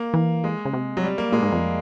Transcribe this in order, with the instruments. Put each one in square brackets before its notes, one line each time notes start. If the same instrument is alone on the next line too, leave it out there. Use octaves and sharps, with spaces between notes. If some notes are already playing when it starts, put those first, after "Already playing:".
Already playing: [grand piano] A#3
[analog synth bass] E3
[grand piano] G#3
[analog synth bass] C#3
C3
[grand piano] F#3
G3
A#3
[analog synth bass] A#2 [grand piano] G#3
[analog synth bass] G#2
F2